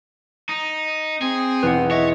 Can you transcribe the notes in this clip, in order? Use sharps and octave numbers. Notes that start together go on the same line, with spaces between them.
D#4
C4 G#4
B1 E2 B4 F#5
C#5 D#5 E5